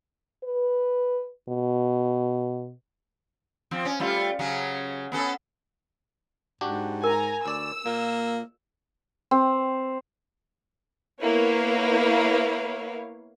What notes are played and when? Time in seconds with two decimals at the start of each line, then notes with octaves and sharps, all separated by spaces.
0.44 B4
1.49 B2
3.71 F3 C4
3.85 C#4
4.00 G3 A3 F4
4.39 C#3 F#3 C#4
5.12 B3 C#4 A4
6.61 G#2 D4 F#4 G4
7.04 A#4 G#5 A#5
7.46 D2 D5 E6
7.86 A#2 A#3
9.31 C4
11.20 A#3 B3 E4 B4 C#5 F5